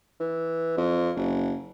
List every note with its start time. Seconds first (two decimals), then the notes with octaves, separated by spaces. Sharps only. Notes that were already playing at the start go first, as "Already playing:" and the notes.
0.20 E3
0.77 F2
1.16 F#1